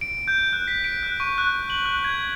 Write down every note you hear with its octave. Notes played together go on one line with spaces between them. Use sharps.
D7
G6
F#6
B6
D7
F#6
C#6
F#6
F#7
F#6
G#6